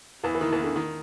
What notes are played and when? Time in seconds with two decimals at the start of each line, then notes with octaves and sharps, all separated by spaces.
0.24 E2 E3
0.35 E3
0.41 D#3
0.53 E2 E3
0.64 D3
0.76 D#3